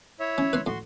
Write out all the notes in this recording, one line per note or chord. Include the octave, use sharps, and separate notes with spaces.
E4 C#5 E5
C#4
B4 B5 C6
A2 F#4 C6